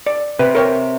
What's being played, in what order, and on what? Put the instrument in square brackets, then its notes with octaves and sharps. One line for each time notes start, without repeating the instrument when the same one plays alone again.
[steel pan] D5
[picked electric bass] C3 [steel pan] B4
[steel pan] A#4 C#5 G5